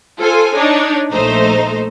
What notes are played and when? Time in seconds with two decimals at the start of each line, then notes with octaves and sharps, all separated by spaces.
0.19 F4 A4 C5 G#5
0.56 D4 D#4 C#5
1.12 A#1 A3 D#4 C5